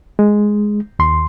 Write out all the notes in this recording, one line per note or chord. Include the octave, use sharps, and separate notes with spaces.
G#3
D#2 C6